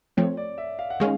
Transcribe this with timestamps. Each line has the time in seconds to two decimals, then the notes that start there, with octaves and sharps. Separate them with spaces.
0.17 F3 A3 C4 C#5
0.37 D5
0.58 E5
0.79 F5
0.90 F#5
1.00 D#3 G#3 C#4 F5